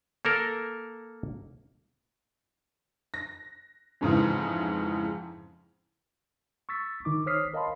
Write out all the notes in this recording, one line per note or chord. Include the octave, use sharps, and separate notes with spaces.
A#3 A4 A#4
A#6
F2 G#2 C#3 E3
C#6 E6 A6 B6
D#3 D#4 D6
C5 C#5 D#6 F6 B6 C7
A#4 D#5 F5 A5 B5 C6